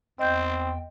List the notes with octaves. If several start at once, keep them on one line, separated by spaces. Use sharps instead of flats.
E2 C4 D#5 G5 G6